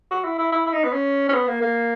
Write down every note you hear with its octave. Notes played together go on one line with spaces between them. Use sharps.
F#4
E4
E4
E4
E4
D#4
B3
C#4
C#4
B3
A#3
A#3